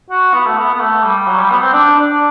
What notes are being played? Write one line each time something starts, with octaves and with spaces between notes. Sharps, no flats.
F#4
B3
A3
B3
B3
A3
G3
F#3
G3
B3
C4
D4
D4